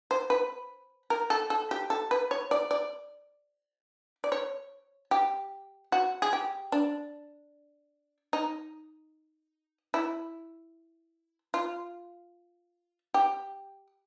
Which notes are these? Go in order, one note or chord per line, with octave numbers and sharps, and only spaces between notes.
C5
B4
A#4
A4
A4
G4
A4
B4
C#5
D5
D5
D5
C#5
G4
F#4
G#4
G4
D4
D#4
E4
F4
G4